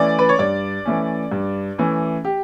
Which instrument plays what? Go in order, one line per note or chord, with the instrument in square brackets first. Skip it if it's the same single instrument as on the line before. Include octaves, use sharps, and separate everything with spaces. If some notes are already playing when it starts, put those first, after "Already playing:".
Already playing: [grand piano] E3 A3 C#4 D5
B4
C#5
G2 D5
E3 A3 C#4
G2
E3 A3 C#4
G4